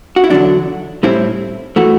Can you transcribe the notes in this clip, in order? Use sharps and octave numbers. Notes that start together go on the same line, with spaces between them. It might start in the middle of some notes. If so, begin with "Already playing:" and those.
F#4
E4
E2 D3 F#3 D4
A2 G3 C4 E4
E3 A3 F#4